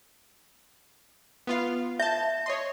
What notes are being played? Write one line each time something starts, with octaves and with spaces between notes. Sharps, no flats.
B3 F4 F5
E5 A5 G6
C#5 D#5 C6